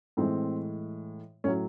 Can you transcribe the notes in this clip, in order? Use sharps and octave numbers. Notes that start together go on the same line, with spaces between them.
A2 E3 G#3 C4
A2 F#3 C#4